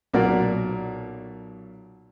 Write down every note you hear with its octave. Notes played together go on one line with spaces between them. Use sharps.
B1 A#2 F#4 A#4 D5